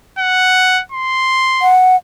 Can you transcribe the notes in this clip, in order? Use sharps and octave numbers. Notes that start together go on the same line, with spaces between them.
F#5
C6
F#5